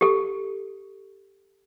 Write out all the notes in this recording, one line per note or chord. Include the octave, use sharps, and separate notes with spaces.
G4 A4